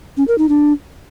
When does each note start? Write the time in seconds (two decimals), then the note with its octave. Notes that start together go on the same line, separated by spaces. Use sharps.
0.17 C#4
0.28 A#4
0.38 D#4
0.49 D4